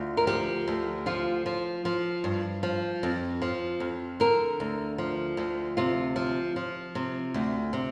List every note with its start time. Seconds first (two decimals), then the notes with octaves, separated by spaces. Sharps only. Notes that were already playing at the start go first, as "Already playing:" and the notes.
Already playing: D2 F4
0.17 A#4
0.27 F3 G4
0.68 D2
1.06 F3 F4
1.46 F3
1.85 F3
2.24 G2
2.63 F3
3.03 F2
3.42 F3
3.80 F2
4.20 D3 A#4
4.60 D2
4.98 F3
5.37 D2
5.77 C3 F4
6.16 F3
6.56 F3
6.95 C3
7.34 D2
7.73 C3